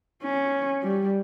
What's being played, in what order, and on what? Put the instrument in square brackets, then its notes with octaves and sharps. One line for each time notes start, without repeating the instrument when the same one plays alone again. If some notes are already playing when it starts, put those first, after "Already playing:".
[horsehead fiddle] C#4
G3